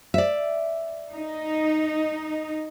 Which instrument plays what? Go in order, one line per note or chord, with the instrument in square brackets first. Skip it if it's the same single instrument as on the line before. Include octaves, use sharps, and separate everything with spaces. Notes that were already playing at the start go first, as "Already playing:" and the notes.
[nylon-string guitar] D5 E5
[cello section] D#4